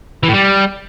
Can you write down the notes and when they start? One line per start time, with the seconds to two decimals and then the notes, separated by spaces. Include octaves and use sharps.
0.23 E3
0.29 A2
0.34 G3